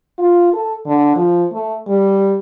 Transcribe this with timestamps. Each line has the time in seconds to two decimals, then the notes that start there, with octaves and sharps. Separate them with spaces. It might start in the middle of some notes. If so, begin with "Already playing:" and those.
0.19 F4
0.53 A4
0.86 D3
1.16 F3
1.52 A3
1.88 G3